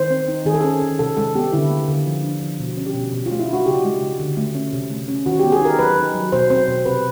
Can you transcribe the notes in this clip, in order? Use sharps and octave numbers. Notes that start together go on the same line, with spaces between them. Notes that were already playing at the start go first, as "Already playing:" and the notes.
Already playing: D#3 C5
C4
D#4
D#3 G#4
A4
C#4 G#4
D#3
C3 A4
G#3 A4
B3 G4
D3 E4
A#3
D3
F3
D4
F3
B2
C#4
G4
B2
B2
F4
A3
E4
D4
F#4
C#3 G4
G#3
C#3
D3
A3
C#4
C3
A3
C#4
D#3 F#4
G4
B3
G#4
D#4 A#4
F#3 B4
D#4
F#3
B2 C5
C4 C5
B2
C3 B4